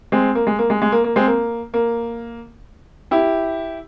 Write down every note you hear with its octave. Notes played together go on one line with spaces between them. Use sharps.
G#3 C4
A#3
G#3
A#3
G#3
G#3
A#3
A#3
G#3 C4
A#3
A#3
E4 G4